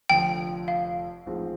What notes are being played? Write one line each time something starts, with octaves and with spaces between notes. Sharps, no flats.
F1 F2 D3 F3 G5
F5
A1 G#2 F3 G#3 C4